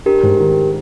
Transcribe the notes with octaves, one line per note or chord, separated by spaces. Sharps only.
D4 G4 A#4
G#2
D#3